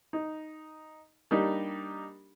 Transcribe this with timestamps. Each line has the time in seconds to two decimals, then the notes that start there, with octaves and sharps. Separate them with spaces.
0.13 D#4
1.31 G3 A#3 D4 D#4 G4